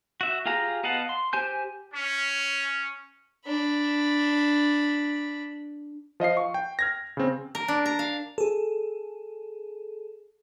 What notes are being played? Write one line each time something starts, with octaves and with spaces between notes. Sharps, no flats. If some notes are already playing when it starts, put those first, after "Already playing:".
F#4 E5
F4 G4 G#4 F5 A#5
B3 D#5 F5 F#5 A5
C6
G4 C5 G#5 G6
C#4
D4 B5
F3 D#5 F5 C7
C#6
G5
F6 G#6 A#6
C#3 C4
A#4
D4
A#5
F5
G#4 A4